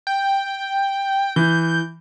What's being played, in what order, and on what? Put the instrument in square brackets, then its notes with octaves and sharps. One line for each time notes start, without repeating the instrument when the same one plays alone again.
[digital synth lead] G5
[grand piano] E3 [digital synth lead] G6